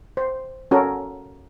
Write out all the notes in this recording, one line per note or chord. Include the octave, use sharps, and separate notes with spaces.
C5
C#4 F#4 A4 A#4